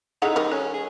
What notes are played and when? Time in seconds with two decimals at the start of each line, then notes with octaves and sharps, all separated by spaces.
0.22 C#3 D#4 E4 G#4 A4 F#5
0.36 D#3 G3 A#4
0.52 C#4 A4
0.74 G#4